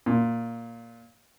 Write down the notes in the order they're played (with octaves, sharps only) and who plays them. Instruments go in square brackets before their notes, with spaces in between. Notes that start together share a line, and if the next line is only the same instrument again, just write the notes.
[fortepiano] A#2